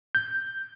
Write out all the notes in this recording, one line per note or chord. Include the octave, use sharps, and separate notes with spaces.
G6